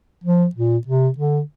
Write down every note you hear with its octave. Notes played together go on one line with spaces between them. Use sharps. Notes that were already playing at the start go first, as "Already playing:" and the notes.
F3
A#2
C3
D3